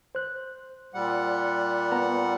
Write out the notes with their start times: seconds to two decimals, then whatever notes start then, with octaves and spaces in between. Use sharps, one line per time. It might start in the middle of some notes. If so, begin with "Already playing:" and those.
0.15 C5 F#6
0.94 A#2 G3 F#5
1.92 B3 A#5